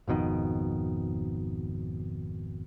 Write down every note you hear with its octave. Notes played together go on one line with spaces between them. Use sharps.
G#1 F2 B2 D#3